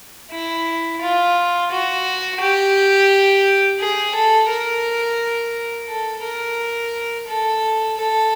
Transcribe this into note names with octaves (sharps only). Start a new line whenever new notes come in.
E4
F4
F#4
G4
G#4
A4
A#4
A4
A#4
A4
A4